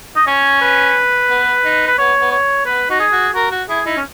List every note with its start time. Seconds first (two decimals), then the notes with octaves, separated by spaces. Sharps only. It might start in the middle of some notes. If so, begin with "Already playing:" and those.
0.16 D#5
0.27 C#4 C#5
0.61 B4
1.30 B3
1.64 D#4
1.87 B4
1.97 B3 C#5
2.20 B3
2.32 C#5
2.66 B3 B4
2.89 D#4 F#4
3.00 G#4
3.12 F#4
3.34 F#4 A#4
3.52 F#4
3.69 E4 G#4
3.86 D#4 E4
3.97 C#4